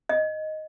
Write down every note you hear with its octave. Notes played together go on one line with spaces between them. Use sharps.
D#5